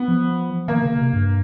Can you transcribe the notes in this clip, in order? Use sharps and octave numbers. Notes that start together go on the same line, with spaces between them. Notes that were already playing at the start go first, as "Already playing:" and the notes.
Already playing: B3
F3
D#3 A#3
C#3
C3
G2